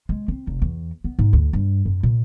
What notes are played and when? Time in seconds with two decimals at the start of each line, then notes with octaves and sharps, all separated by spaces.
0.09 G#3
0.28 C4
0.47 F1
0.62 E2
1.04 B3
1.19 G#2
1.33 D2
1.53 G2
1.85 F#2
2.03 A#2